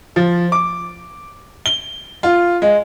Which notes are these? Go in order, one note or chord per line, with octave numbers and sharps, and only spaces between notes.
F3
D6
G7
F4
G#3